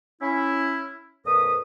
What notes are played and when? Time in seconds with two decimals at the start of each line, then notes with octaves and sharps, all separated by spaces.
0.22 C#4 E4
1.26 F2 A#2 B4 D#6